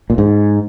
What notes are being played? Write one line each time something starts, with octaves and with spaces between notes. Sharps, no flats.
A#2
G#2